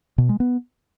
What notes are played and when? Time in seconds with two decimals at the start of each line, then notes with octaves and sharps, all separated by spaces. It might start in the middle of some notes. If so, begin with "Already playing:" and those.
0.18 B2
0.29 G#3
0.40 B3